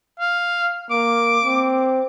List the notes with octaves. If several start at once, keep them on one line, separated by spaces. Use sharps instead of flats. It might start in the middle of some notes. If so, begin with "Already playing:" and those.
F5
A#3 D6
C4